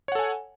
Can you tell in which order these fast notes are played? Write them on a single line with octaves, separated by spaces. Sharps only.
C#5 F#5 A4 G#5